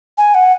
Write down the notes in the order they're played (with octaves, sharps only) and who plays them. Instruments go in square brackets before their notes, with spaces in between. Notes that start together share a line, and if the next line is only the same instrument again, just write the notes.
[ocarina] G#5
F#5